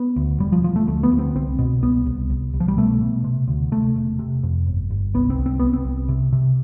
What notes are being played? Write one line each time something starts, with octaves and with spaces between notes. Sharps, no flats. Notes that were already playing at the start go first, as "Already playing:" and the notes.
Already playing: B3
D2
E1 G3
F3
E1 F3
A3
D2 A3
B3
D2
C4
C2 C4
B2
C2 B3
C2
C2
C2
F3
G3
B2 A3
B2
C3
D2
C3 A3
E1
C3
F2
G1
G1
C2 B3
C4
C2
C4
C2 B3
C4
C2
C3
C3